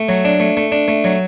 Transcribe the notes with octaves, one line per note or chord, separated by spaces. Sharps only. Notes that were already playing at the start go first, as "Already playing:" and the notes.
Already playing: A3
F#3
D4
A3
A3
D4
A3
F#3